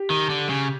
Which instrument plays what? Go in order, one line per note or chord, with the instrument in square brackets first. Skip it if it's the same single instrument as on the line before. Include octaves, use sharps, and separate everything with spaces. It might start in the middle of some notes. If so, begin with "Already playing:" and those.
Already playing: [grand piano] G4
[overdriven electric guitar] D#3
D3
C#3